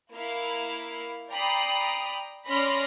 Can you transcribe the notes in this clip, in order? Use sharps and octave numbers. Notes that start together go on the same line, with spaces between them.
A#3 E4 F5
D5 G5 A#5 B5 D#6 C7
C#4 D5 B5 C6 F6 A#6